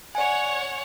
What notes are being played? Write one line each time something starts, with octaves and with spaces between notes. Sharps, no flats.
C#5 D5 F#5 G#5